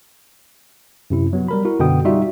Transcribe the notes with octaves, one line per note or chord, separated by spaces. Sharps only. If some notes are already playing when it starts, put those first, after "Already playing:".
F#2 C3 E4
F#3 B3
G3 A#4 B5
E4 F#4 A#4
F#2 B2 D3 B3 G5 D#6
G3 D#4 F4 F#4 E5